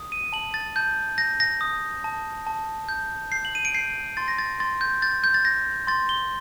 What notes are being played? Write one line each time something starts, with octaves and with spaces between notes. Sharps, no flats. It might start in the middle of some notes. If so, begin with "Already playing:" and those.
Already playing: D#6
D#7
A5 F#7
A6
A5 G6
G6 A#6
A#6
D#6
A5
A5
G6
G6 C7
F#7
D#7
D7
G6 C7
C6 A6
A#6
A6
C6 A6
G6
G6 A6
G6
A6
G6 A#6
C6 A6
G7